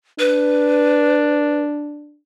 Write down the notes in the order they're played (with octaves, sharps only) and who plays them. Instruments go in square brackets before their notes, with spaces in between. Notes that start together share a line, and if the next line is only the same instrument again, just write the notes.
[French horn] D4 [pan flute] B4